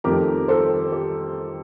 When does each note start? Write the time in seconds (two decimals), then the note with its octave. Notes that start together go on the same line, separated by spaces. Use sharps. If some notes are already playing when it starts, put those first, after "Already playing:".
0.04 F2 D#3 A3 G4 A#4
0.48 A4 C5
0.92 G4